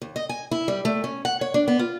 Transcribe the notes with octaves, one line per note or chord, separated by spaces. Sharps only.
D#2
D#5
G#5
E4
G3
A3
C#4
F#5
C#5
D4
B3
F4